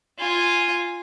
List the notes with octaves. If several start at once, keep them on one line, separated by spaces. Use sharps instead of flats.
F4 G#5